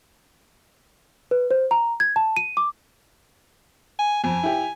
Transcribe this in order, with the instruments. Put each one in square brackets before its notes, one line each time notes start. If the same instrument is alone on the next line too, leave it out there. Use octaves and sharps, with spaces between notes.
[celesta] B4
C5
A#5
G#6
A5
D#7
D6
[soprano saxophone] G#5
[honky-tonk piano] F2 [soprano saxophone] G#5
[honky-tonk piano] E4 G4